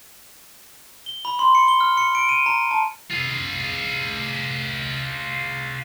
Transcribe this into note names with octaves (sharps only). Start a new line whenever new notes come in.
G7
B5
C6
C#7
G7
F6
C#7
D7
D#7
A#5
A5
F4 G#4